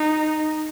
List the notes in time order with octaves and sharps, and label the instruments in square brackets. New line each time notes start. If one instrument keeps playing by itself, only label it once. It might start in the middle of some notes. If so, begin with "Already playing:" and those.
Already playing: [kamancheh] D#4